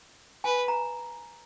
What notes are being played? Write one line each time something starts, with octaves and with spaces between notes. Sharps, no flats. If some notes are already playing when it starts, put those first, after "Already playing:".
B4 G#5
A#5